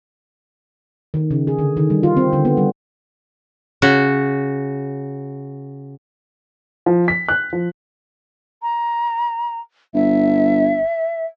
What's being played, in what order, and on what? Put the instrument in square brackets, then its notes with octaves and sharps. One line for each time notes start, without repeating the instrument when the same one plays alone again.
[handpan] D#3
C#3
G#4
D3
D#3
G3
F4
C4
D3
B3
G3
[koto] C#3 F#4
[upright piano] F3
B6
F#6
F3
[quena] A#5
[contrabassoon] G1 [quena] E5